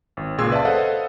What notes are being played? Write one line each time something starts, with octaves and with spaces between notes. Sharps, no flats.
G#1
C#2 A#2 G#4 C6 E6 G#6
B4 D5 E5 F5 A5
A4 B4 C5 D#5 F5 F#5